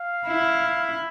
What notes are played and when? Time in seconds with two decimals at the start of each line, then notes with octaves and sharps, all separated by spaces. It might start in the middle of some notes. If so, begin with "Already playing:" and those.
Already playing: F5
0.27 E4